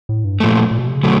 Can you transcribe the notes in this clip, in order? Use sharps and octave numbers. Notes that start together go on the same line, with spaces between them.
A2
G2
A#2 F3 A3
A#2
B2
C3
C#3
B2 D3 F#3 A3